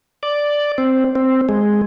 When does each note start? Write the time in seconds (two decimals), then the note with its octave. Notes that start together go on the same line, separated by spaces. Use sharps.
0.23 D5
0.78 C4
1.15 C4
1.49 G#3